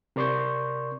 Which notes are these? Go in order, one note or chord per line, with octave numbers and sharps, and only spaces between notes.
C3 A#4 D5 C6 C#6 G6